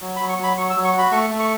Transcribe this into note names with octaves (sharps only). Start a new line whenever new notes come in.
F#3
B5
F#3
C#6
F#3
B5
F#3 C#6
E6
F#3
C#6
F#4
B5
A3 C#6
A3
C#6